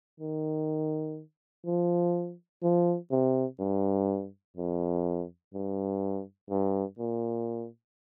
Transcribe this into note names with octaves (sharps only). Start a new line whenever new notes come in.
D#3
F3
F3
C3
G2
F2
G2
G2
A#2